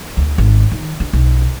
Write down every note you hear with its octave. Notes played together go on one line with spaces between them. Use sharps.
D2
G#1
D#3
D3
B1